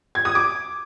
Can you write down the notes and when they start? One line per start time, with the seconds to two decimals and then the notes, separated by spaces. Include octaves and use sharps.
0.15 G#6
0.25 D#6
0.35 D6